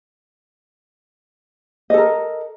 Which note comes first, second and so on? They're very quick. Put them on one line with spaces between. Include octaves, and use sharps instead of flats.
D#5 A4 A#4